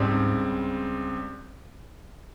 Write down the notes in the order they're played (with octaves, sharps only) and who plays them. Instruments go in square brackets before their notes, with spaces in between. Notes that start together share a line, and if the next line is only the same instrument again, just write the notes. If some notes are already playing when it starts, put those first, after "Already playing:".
Already playing: [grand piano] C#2 C#3 G3 C4 [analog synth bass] G#2